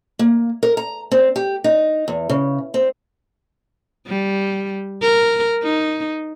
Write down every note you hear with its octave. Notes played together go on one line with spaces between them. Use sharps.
A#3
A#4
A#5
C4
G4
D#4
E2
C#3
C4
G3
A#4
D#4